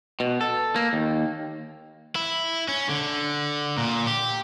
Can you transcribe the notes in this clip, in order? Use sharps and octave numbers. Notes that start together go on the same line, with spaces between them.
B2
A4
A#3
D#2
E4
C#4
D3
A#2
G4